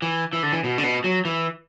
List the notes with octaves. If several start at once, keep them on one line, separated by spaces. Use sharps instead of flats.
E3
E3
D3
E3
B2
D3
B2
F#3
E3